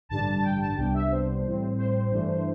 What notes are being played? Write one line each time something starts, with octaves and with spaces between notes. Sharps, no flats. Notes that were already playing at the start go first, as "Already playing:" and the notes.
A1 G2 D3 G3 D4 A5
G5
A5
C2 C3 G3 B3 D4 G5
E5
C5
A1 A2 G3 C4
C5
G2 E3 A3 D4